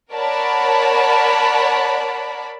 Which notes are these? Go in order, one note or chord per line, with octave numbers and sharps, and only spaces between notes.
A#4 C#5 D5 F#5 A5 B5